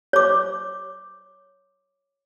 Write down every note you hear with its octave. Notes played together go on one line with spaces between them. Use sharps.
C#5 D6